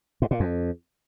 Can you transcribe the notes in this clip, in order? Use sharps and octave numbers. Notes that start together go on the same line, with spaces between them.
G#2
A#2
F2